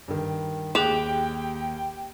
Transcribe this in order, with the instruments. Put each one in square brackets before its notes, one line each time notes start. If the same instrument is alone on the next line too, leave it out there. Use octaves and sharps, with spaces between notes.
[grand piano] G2 D#3
[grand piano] D#2 F#6 F#7 [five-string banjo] G4 [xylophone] G#4 D6 E7 [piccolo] G5